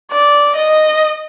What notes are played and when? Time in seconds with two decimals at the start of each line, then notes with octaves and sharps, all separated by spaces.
0.12 D5
0.56 D#5